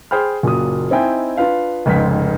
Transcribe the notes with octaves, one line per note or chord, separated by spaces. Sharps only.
G#4 C5 G5 B5 F6
F#1 A#2 F#3 D#6
C4 D#4 E4 D#5 G5 G#5
D4 F4 B4 F5
F1 C#2 G#2 B6